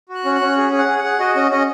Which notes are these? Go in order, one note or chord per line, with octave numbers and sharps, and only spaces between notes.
F#4
F#6
C#4
F#6
C#4
G#4
G#4
F#5
G#4
F#5
G#4
F#4 D#5
C#4 D#5
C#4 D#5